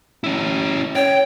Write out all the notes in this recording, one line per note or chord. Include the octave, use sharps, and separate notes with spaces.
C#4 E4
C#5 G5